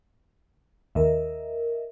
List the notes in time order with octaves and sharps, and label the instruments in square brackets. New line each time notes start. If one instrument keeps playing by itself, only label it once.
[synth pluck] D#2 [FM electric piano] A#4 D#5 E5